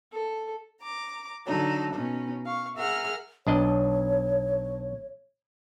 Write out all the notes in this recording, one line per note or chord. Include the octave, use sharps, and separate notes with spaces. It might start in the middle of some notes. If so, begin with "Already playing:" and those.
A4
A#5 D6
D3 F#3 D#4 A4
B2 C#4 D#4
F5 C#6
G#4 A#4 E5 F#5 F6
B1 D4 C#5 D#5